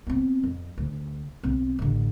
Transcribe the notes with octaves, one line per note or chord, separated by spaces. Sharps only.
B3 C4
F2
D2
B1 C4
A1 D3